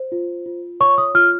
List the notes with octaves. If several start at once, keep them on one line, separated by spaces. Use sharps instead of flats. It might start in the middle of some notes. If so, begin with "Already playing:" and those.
Already playing: C5
F4
F4
C#5 C#6
D#6
F4 F6